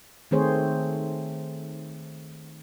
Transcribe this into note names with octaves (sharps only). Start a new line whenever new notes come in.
D#3 A3 C4 G#4 C5 C#5